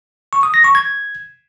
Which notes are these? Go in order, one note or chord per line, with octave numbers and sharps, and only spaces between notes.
C#6
D#6
A#6
C#6
G#6